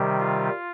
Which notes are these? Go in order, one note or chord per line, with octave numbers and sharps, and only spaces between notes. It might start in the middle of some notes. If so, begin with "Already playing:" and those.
Already playing: C3 D#3 G3
F4